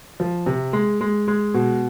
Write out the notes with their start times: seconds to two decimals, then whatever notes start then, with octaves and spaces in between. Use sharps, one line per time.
0.20 F3
0.46 C3
0.73 G#3
1.01 G#3
1.28 G#3
1.54 B2